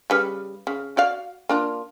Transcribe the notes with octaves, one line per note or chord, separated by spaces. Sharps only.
C#3 G3 B4
C#3
F#4 D5 F5
A#3 D4 F4